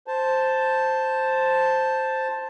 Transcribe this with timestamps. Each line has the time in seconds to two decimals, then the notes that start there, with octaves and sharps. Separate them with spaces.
0.07 C5 A5